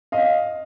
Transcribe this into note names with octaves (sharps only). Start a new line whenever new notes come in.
D#5 F5